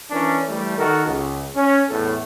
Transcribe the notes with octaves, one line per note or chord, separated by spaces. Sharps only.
E3 C#4 D4 A#4
E3 G3 A3
D#3 F#4 A4 A#4
C#2
C#4
E2 A2 A4